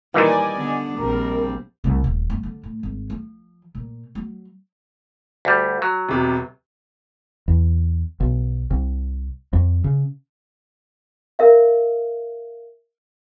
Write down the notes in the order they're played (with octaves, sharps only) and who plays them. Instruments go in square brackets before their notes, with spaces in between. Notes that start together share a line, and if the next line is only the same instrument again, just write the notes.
[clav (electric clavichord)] A#2 D#3 E3 [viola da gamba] G3 [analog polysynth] D5 D#5 G#5
[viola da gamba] D3 B3 D4
[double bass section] A#1 [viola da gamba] G3 C4 [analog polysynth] A#4
[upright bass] C2
D#1
G2
D3
A2
G#1
F3
A#2
F#3
[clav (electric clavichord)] D2 G3
F#3
[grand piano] E1 C3
[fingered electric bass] E2
B1
C2
F2
C#3
[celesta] A#4 E5 F5